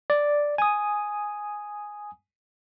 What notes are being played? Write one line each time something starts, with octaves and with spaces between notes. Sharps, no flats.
D5
G#5 D#6